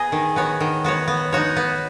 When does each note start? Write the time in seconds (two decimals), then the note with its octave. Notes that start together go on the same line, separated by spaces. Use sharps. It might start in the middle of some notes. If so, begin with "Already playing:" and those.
Already playing: B3 G#4 D#5
0.12 D#3
0.36 B3 F#4 C#5
0.60 D#3
0.84 B3 F#4 C#5
1.08 B3
1.32 D#4 F#4 C#5
1.57 B3